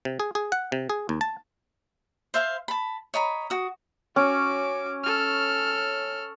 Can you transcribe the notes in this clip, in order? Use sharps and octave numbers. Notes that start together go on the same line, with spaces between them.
C3
G#4
G#4
F#5
C3
G#4
D#2
A5
C5 E5 F5 C6
A5 B5
C#5 D#5 A#5 B5
F#4 D#6
C#4 F#4 D6
A4 F6